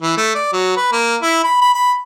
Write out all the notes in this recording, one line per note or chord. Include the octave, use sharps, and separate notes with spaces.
E3
A3
D5
F#3
B4
A#3
E4
B5
B5
B5